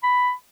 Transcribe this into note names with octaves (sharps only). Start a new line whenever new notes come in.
B5